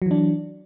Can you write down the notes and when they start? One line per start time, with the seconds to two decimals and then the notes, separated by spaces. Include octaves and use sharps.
0.02 F#3
0.06 E3
0.11 D4